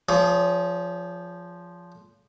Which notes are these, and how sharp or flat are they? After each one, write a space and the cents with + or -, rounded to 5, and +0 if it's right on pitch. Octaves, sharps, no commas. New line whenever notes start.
F3 +0 G#4 +0 C#5 +45